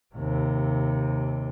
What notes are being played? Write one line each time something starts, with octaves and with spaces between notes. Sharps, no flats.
D#2 C3